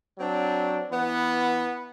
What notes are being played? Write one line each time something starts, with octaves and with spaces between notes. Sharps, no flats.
F#3 C4 D4
E3 B3